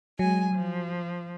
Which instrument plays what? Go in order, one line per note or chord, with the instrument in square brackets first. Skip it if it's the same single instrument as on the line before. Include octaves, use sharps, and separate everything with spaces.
[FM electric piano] F#3 [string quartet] G#3 G#5
[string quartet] F3